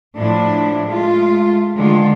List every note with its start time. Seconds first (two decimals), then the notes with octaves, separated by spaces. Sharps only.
0.16 A2 F3 D4 E4
0.85 G#3 A3 F4
1.76 D3 D#3 G#3 A3 F4